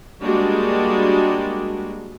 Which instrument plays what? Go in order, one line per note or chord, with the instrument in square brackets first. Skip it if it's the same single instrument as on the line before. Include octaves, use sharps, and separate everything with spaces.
[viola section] G3 G#3 A#3 D4 F#4 G4